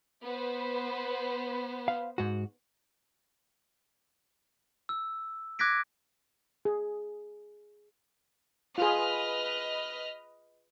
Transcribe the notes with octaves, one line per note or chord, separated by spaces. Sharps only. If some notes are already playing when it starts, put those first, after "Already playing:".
B3 B4 C5
F5
G#2 F#4
E6
D6 F#6 G#6 A#6 B6 D7
G#4
F4 G#4 B4 D#5 F6